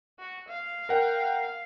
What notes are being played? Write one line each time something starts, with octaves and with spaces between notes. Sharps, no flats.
F#4
F5
A#4 F#5 G5